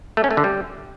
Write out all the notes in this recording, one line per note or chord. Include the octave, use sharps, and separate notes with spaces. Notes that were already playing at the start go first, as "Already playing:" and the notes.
A3
C#4
A3
D3
G3